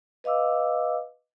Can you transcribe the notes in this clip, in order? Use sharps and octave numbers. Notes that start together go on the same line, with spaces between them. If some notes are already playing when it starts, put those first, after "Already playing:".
B4 D#5 F5 D6 E6